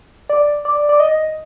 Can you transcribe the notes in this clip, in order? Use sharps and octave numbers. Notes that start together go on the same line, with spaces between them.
D5
D5
D5
D#5